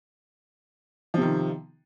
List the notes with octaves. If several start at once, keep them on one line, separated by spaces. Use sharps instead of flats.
C3 D#3 F3